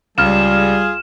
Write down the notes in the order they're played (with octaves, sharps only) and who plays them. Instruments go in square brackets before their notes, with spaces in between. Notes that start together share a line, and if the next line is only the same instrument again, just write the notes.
[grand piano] C#2 [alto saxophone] G3 [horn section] F4 G#4 [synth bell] F6 E7